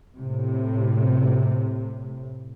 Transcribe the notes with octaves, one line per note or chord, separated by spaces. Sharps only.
A2 C3